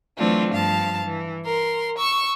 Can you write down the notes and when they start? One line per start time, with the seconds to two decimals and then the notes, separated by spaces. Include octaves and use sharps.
0.18 E3 F#3 A3 C4 D4 F4
0.52 G2 F3 F5 A5
1.07 E3
1.45 A#4 C6
1.97 C#6 E6